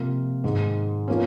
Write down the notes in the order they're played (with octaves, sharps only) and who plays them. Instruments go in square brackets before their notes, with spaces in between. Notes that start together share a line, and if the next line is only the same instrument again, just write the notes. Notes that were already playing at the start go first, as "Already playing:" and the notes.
Already playing: [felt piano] C3 F3 A#3 F4
G#2 D#3 G#3
F3 A#3 C#4